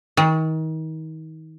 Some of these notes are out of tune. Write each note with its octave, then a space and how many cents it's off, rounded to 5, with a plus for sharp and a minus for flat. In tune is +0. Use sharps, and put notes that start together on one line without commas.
D#3 +35